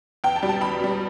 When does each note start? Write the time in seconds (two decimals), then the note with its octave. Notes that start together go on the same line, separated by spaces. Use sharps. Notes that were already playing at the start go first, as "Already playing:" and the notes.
0.24 E2 G5
0.36 A5
0.43 B2 G3
0.49 A5
0.61 E2 B5
0.80 B2 G3